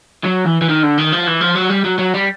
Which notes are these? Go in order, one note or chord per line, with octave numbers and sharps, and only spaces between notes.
F#3
E3
E3
D#3
D3
D#3
F3
E3
F3
F#3
G3
F#3
F#3
G3